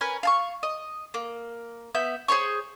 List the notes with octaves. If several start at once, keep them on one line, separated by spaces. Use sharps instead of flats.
C#4 A#4 B4 G#5
F5 A5 C#6
D#5
A#3
B3 E5 G6
G#4 C5 C#5 C#6